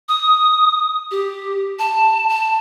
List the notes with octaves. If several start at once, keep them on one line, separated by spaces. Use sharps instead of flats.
D#6
G4
A5
A5